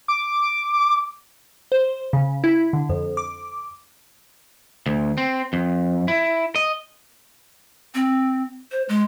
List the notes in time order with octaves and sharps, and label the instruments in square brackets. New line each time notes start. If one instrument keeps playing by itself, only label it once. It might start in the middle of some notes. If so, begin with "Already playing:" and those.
[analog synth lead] D6
[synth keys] C5
C#3
E4
D3
F2
D6
[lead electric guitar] D2
C4
F2
E4
D#5
[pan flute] C4
C5
G#3